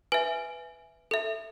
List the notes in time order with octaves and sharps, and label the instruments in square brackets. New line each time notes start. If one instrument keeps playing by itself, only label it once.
[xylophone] B4 E5 G#5
A4 E5